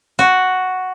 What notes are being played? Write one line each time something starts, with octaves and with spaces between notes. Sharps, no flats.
F#4